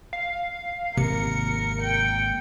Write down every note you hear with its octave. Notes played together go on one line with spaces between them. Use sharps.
F5
G#1 C3 A#3 A#4 C#7
G5